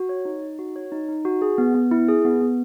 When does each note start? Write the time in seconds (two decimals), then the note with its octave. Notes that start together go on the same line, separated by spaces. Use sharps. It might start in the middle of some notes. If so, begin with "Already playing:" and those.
Already playing: F#4
0.09 C#5
0.25 D#4
0.42 D#4
0.59 F#4
0.76 C#5
0.92 D#4
1.08 D#4
1.25 F#4
1.42 G#4
1.58 B3
1.75 B3
1.91 E4
2.08 G#4
2.25 B3
2.41 B3